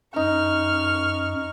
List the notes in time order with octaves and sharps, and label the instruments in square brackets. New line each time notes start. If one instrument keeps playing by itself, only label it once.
[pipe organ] F#2 [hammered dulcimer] D#4 [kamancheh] C#6 F6